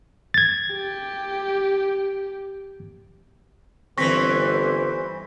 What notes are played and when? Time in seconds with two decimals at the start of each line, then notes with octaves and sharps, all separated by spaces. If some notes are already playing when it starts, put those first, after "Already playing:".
0.34 G#6 A6
0.72 G4
3.98 G1 E3 C4 C5 C#6 A#6 B6